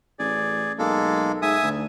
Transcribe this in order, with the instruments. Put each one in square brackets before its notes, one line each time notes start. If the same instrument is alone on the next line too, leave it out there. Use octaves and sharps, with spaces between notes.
[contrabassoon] A1 [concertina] G#4 D5
[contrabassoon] B1 [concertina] G#3 A#3 A4
[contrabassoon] G#2 [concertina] E5 G#5 D#6
[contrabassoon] D2